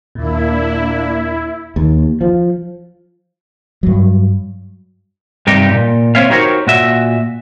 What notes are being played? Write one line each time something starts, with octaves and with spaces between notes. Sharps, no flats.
D#2 A#2 A#3 D4 E4
D#2
F3
G2 F#3
G2 C3 D#4 G4
A#2
C4 C#5 E5 F5
D#4 F#4 G4 A#4 C5 C#5
A#2 F#4 E5